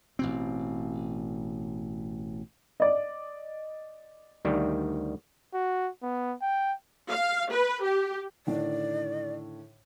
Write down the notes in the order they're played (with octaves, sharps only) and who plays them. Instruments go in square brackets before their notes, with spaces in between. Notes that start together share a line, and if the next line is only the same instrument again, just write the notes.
[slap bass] A1 B2 C4
[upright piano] D5 D#5
[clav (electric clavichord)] D2 D#3 G3
[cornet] F#4
B3
G5
[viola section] F5
B4
G4
[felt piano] A2 D3 D#3 [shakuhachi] D5